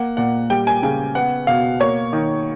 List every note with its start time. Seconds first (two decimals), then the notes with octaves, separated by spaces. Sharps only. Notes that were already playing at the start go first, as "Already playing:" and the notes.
Already playing: A#3 F#5
0.17 A#2 F#5
0.50 G3 G5
0.67 G#5
0.83 C#3 G#5
1.15 B3 F#5
1.47 B2 F5
1.80 A#3 C#5
2.13 D#3